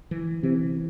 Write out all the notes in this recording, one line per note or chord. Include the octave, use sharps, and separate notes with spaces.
E3
C3 E3